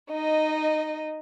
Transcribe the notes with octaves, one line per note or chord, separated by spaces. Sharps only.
D#4 D#5